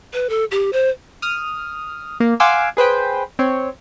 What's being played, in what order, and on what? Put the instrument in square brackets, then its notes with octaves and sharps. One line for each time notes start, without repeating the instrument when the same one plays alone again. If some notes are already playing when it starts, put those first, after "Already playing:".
[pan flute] B4
A4
G4
C5
[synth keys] D#6 F6
A#3
F5 F#5 G#5 C6 D6 E6
G#4 B4 C5 G5
C4 C#5